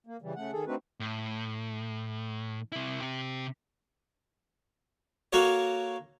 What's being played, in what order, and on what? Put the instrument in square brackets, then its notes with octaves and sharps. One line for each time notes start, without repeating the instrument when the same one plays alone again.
[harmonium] A#3
C#3 E3 G3
C#3 A3 F#5
D#3 G#4 A4
A3 C4 D4 D#4 F#4 B4
[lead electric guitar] A2
C3 E4
C3 G4
[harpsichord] A#3 F#4 A4 A#4 C#5